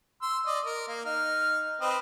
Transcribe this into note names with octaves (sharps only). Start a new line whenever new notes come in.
C6 E6
D5 D#5
A#4
A#3
D#4 F6
C4 B4 D#5